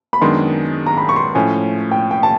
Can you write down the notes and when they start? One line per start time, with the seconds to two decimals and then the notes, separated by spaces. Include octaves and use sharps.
0.13 B5
0.21 F#2 D#3 G#3 B3 D4 C6
0.86 A#5
0.97 B5
1.09 C#6
1.16 C6
1.35 A2 F3 A3 C#4 G#5
1.91 G5
2.11 G5
2.23 A5